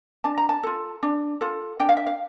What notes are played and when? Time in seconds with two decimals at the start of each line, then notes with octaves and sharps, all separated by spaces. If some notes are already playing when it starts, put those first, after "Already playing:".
0.24 D4 A5
0.38 A#5
0.49 A5
0.63 F4 A4
1.03 D4
1.41 F4 A4
1.80 D4 G5
1.89 F5
1.97 E5
2.06 F5